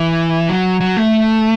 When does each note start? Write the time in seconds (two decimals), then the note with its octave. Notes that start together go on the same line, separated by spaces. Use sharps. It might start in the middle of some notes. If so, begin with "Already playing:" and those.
Already playing: E3
0.49 F#3
0.81 F#3
0.97 A3